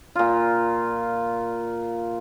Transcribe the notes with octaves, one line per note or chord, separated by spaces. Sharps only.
A#2 F4